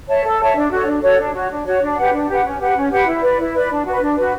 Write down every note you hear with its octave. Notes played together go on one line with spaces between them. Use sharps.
C#5 E5 A5
A4
C#5 E5 A5
D4
F#4 A4 C#5
D4
F#4 A4 C#5
D4
F#4 C#5
D4
F#4 C#5
D4
G4 B4 F#5
D4
G4 B4 F#5
C#4
G4 B4 F#5
C#4
G4 B4 F#5
E4
B4 D5
E4
B4 D5
D4
F#4 B4
D4
F#4 B4